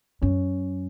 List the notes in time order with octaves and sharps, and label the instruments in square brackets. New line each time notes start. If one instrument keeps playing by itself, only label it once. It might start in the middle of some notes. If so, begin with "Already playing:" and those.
[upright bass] F#2 [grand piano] C#4